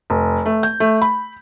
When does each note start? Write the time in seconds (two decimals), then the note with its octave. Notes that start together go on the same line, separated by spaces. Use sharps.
0.10 F1
0.46 A3
0.63 G6
0.80 A3
1.02 B5